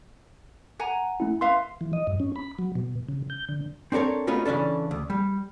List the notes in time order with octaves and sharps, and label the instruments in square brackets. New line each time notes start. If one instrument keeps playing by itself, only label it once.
[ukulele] F#5 G#5 A#5
[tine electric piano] A3 C#4 E4
[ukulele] B4 E5 F5 [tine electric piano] C6
[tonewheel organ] E3
D#5
G2
C#4
B5
F#3
B2
C#3
G6
D3
[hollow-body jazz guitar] C4 D4 A4 A#4 C#5
A3 B3 C#4 D#4 F4 F#4
C#3 E3 C#4 D4 A4
D2
G3